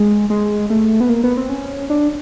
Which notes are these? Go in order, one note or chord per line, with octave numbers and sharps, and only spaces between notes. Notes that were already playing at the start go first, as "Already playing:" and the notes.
Already playing: G#3
G#3
A3
B3
A#3
B3
C4
C#4
D4